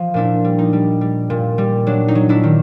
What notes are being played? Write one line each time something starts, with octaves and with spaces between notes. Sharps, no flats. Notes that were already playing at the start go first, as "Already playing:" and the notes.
Already playing: F3
A#2 D4 E4
G3
D#4
G3
G3
A#2
G3
F#3 D4
D#4
F#3
D4 E4
D#3